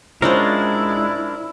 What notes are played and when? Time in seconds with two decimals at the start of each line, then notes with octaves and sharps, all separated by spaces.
0.22 G#3 C#4 D4 E4 F4 A#4 C5